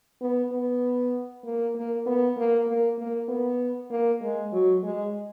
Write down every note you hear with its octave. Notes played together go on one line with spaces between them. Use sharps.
B3
B3
A#3
A#3
B3
A#3
A#3
A#3
B3
A#3
G#3
F#3
G#3